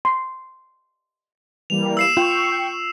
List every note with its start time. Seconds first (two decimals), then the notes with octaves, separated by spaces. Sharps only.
0.05 C6
1.70 E3 G3 A#3 F7
1.97 E6 C7 E7
2.17 F4 G5 C#6